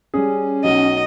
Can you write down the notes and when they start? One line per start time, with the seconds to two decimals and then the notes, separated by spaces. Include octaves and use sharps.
0.14 G3 C#4 G#4
0.64 B1 F#3 D#5